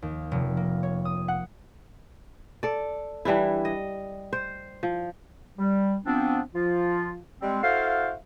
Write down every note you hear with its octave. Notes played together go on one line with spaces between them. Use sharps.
D#2
F1
A#3
C#5
D#6
F#5
A4 D5
E3 G3 D4 E4
D#5
C5
F3
G3
F3 B3 C4 D4
F3 F4
G3 G#3 C4
E4 F#4 A4 C5 F5